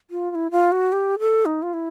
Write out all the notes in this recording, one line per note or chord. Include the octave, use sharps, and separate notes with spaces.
F4
F4
E4
F4
F#4
G4
A4
D#4
F4
E4